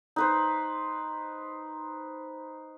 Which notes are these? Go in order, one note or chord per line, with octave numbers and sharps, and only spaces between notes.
D#4 B4 C5